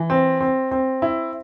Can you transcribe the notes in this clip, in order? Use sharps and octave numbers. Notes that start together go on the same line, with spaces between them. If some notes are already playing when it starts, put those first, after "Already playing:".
Already playing: E3
C4
C4
C4
E4